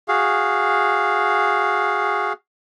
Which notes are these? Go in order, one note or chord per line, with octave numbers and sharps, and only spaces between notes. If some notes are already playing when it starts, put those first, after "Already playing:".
F#4 G#4 F5